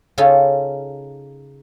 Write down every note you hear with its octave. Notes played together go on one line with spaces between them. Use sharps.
C#3 C#4 D#4 F4 A4